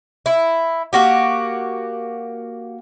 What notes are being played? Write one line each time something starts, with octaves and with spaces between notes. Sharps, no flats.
E4
A#3 F#4 G4